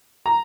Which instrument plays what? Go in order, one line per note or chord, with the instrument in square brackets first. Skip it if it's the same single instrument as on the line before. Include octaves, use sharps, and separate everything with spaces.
[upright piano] A#5